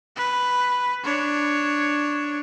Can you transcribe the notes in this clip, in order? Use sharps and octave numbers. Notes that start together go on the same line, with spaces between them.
B4
D4 C#5